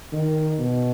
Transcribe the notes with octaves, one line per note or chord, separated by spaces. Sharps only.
D#3
B2